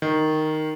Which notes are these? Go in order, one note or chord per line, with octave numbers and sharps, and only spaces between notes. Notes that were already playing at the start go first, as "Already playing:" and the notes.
D#3